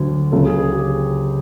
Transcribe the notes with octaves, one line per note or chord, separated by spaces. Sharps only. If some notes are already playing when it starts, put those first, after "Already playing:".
Already playing: D2 D3 F#3
C#2 C#3 F#3 A4
G#4
G#4
G4